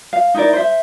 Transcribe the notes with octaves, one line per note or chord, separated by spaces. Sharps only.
F5
D#4 E4 A#4 D5
C5 E5